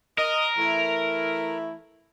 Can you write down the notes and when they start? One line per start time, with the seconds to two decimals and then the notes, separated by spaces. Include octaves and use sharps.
0.18 A#4 D#5
0.58 E3 A3 E4